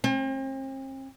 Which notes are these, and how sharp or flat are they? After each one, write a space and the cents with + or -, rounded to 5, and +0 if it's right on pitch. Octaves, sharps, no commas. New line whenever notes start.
C4 +40